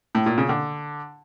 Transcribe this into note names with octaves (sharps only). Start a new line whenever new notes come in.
A2
A#2
C#3
D3